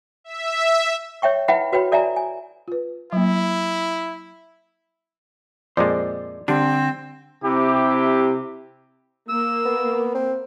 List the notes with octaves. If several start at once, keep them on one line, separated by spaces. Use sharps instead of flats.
E5
C#5 E5 G5 C#6
E4 B4 E5 F#5 G5 B5
F#4 B4 C#5 G5 B5
A4 D5 E5 G#5 A#5
G#5
F4 B4
F#3 A#3 E4
F2 A#2 G#3 C5 D5
D3 G3 C4 D4
C3 E4 G4
A#3 E6
B3
C4